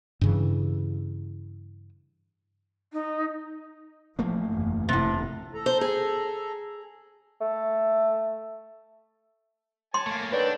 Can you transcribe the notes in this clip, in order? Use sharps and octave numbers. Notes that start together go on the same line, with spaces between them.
G2 C#3 E3
D#4
A1 F3 A3 A#3
F#1 E2 G2
F1 A2 C3
A4 A#5
C5
G#4
A3
C#5 G#5 A5 C6
A3 A#3
D3 D#3 D4 B4 C#5 D5 G5